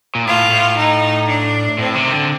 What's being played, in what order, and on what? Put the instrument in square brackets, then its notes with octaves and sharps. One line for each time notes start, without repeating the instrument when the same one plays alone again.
[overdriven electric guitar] A#2
[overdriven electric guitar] A2 [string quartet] F4
[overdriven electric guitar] A2
[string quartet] D#4
D4
[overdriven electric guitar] A2 [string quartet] C4
[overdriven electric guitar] C3
D#3
D3